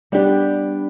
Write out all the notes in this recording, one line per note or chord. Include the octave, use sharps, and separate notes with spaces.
G3 B3 D4 G4 D5